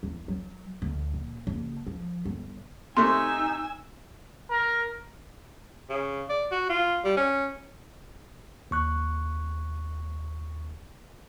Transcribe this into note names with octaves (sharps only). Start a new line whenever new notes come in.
E2
F#3
D2
A#2
F#1
F3
G1
C3 A3 D#4 G#5 C6 E6
A#4
C#3
D5
F#4
F4
G3
C#4
D#2 C#6 F#6